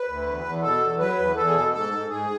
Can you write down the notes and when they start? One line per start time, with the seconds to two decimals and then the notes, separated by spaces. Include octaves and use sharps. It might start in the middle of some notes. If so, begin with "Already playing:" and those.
Already playing: B4
0.08 D2
0.27 E2
0.45 E2
0.63 B2 A4
0.81 E2
0.99 F#3 B4
1.18 E2
1.36 E2 A4
1.47 G#4
1.54 B2 A4
1.73 G#2 A4
1.92 G#2
2.09 G#2 G#4